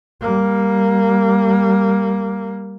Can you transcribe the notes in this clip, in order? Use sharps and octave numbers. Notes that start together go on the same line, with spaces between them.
G3 A#3